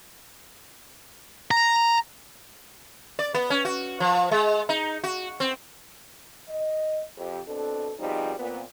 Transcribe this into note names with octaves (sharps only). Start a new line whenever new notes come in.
A#5
D5
B3
C#4
F#4
F3
G#3
D#4
F#4
C4
D#5
F2 G4
B2 C4 D4 A4
B2 F3 G3 C4 D#4 G#4
A#2 B3 C4